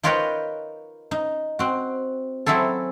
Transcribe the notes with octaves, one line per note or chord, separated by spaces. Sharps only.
D#4 F4 A#4 B4 C#5 G5
D#4
C4 F#4
F#3 C4 E4 G#4 A4